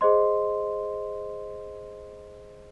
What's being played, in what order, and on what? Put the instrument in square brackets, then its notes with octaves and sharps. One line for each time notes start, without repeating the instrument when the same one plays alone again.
[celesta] G#4 C5 D#5 C6